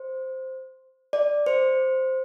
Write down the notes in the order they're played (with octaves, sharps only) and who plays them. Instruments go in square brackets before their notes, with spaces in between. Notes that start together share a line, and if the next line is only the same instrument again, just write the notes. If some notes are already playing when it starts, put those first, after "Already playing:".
Already playing: [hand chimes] C5
D5
C5